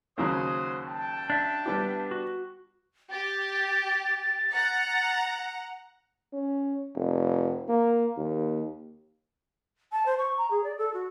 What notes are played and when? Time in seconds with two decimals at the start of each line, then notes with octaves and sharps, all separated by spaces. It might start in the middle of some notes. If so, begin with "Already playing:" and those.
0.18 D#2 C#3 F#3 F#4 C5 D#6
0.88 G5 A5
1.30 D4 E5
1.66 G3 B3 G4
2.11 F#4
3.12 G4 A6
4.54 F#5 A#5
6.33 C#4
6.95 F1
7.69 A#3
8.17 D#2
9.92 A5
10.06 C5
10.18 C#6
10.37 A#5
10.51 G#4
10.64 D5
10.78 A4
10.94 F#4